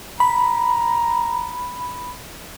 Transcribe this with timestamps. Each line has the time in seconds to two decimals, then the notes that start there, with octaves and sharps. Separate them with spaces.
0.20 A#5 B5